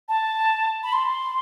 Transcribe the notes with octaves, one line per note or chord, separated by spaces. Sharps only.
A5
B5
C6